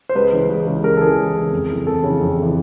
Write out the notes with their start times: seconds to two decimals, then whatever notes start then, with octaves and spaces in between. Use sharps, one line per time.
0.09 C5
0.15 C#2 B4
0.32 C#3 E3
0.49 C#2
0.67 C#3 E3
0.84 C#2 A#4
0.97 A4
1.01 C#3 E3 G#4
1.18 C#2
1.36 C#3 E3
1.52 F2
1.69 C#3 E3
1.87 F2 A4
2.04 C#3 E3
2.21 F2
2.38 C#3 E3